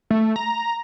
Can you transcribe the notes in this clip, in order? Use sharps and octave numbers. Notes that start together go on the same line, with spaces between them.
A3
A#5